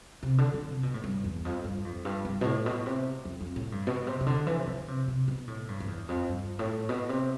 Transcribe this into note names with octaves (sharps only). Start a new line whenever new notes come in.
C3
D3
D3
C3
B2
A2
G2
E2
F2
G2
F2
G2
G2
B2
A2
B2
C3
F2
F2
A2
G2
B2
C3
C3
D3
E3
C3
D3
C3
C3
B2
A2
G2
F2
E2
F2
G2
A2
B2
C3